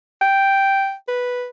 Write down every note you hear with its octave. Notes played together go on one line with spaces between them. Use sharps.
G5
B4